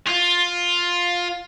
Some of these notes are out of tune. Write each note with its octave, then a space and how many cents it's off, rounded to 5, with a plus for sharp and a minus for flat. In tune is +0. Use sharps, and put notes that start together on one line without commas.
F4 +10